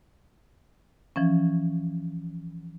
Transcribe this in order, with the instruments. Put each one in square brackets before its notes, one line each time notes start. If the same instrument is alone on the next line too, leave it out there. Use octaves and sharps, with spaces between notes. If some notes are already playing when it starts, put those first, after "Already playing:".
[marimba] E3 F3 C#4